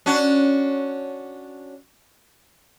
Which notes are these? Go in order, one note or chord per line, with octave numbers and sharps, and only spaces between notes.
C#4 D4 F#4